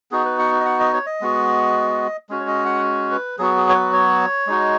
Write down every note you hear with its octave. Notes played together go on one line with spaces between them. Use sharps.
B3 D#4 F#4 G#4
B4
F#5
D#5
F#5
D#5
C#5
D#5
G#3 B3 F#4
G#3 C#4 F#4
C#5
D#5
F#5
B4
F#3 B3 F#4 G#4
G#4
C#5
B4
C#5
G#3 D#4 F#4